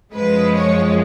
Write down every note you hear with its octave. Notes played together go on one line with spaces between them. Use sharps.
F#2 F3 G#3 B4
C#5